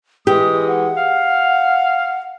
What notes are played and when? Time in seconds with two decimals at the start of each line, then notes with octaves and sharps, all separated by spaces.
0.27 E3 G#3 G4 D#6
0.68 F#5
0.96 F5